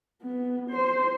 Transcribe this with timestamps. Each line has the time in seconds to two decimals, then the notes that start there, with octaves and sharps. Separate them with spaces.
0.22 B3
0.70 C5